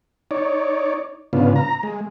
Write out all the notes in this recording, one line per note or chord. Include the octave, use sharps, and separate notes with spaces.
D#4 C#5 D5
G#2 C#3 B3 D4 F4
A#5
G#3